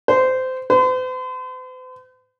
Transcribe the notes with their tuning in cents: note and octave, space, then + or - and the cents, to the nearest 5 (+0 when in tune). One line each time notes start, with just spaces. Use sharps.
C5 -20
C5 -45